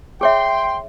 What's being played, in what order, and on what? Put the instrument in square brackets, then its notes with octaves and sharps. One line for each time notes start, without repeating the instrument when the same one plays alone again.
[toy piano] G#4 C#5 E5 [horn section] G5 C6